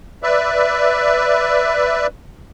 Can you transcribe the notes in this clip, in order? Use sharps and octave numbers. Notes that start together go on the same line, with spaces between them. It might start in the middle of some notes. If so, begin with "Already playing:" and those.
B4 D5 E5